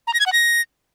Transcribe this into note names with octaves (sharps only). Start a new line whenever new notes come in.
A#5
A#6
G#6
F#5
A#6